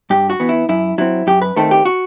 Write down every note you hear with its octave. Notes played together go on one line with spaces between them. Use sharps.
G2 G4
F#4
E3 B3
E4
F#2 E4
F#3 C4 E4
F#2 G4
B4
D#3 A3 C4 A4
G4
F#4